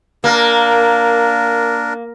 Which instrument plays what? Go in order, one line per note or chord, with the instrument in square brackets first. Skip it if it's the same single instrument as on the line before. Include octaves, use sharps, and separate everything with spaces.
[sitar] A#3 [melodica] D4 A#4